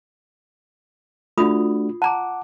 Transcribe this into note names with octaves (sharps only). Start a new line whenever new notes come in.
A3 D4 F4 F#4 B5 D#6
F#5 A5 A#5 D6